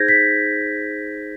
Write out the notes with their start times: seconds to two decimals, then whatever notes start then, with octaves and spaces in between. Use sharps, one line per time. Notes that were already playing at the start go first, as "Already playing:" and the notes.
Already playing: D#4 G#4 C5 G6 G#6 A#6
0.08 B6